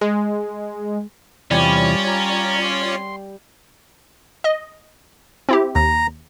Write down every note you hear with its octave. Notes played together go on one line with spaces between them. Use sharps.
G#3
E2 C3 E3 G3 C#4 F4 C#5 D5
A#5
C6
D#5
C4 E4 G4
D#2 A#5